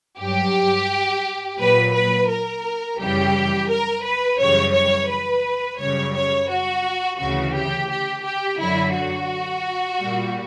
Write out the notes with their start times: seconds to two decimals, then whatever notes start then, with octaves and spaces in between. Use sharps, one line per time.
0.19 G2 F#3 G4
1.58 A#2 F#3 B4
1.94 B4
2.29 A#4
2.99 F#2 C#3 E3 G3 G4
3.69 A#4
4.04 B4
4.39 F#2 C#3 E3 G3 C#5
4.73 C#5
5.09 B4
5.79 F#2 C#3 G3 C#5
6.15 C#5
6.50 F#4
7.19 D2 C#3 E3 F#4
7.54 G4
7.90 G4
8.24 G4
8.59 F#2 D3 F#3 E4
8.94 F#4
10.00 A#2 G3